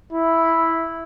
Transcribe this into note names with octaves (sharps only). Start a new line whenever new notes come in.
E4